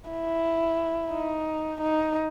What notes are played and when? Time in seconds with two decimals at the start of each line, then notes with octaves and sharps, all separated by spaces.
0.10 E4
1.12 D#4
1.81 D#4